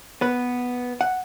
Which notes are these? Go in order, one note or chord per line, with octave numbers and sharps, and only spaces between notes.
B3 B4
F#5